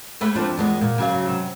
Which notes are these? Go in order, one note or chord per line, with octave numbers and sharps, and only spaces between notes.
G#3 A3 B4
F3 C4 D4
E2 G#3 B3
A#2
C#3 F#3 F5
C3 F#3